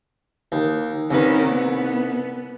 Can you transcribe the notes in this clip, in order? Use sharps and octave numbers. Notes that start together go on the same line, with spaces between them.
D#2
C2 D#3 C#4 B4
B3